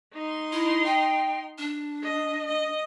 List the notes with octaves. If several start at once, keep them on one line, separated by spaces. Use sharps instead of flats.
D#4 C6
E4
G5
D4
D#5
D#5